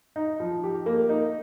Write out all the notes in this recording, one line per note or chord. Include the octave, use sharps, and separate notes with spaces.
D#4
F3
G4
A#3
D#4